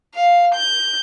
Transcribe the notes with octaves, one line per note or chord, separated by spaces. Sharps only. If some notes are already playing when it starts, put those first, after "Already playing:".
F5
G6